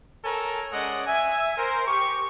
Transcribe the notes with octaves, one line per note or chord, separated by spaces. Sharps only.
A4 A#4 C#5 G#5 A#5
G#3 C#4 D5 D#5 F#5
E5 G#5
A#4 C5
G4 C#6